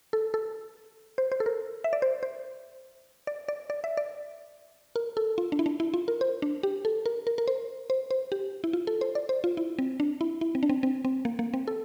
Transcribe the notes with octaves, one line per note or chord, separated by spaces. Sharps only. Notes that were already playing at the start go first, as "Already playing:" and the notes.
A4
A4
C5
C5
A4
A#4
E5
D5
C5
C5
D5
D5
D5
E5
D5
A#4
A4
F4
D4
E4
D4
E4
F4
A#4
C5
D4
G4
A4
A#4
A#4
A#4
C5
C5
C5
G4
E4
F4
A4
C5
D5
C5
F4
E4
C4
D4
E4
E4
C4
D4
C4
C4
C4
A#3
A#3
C4
A4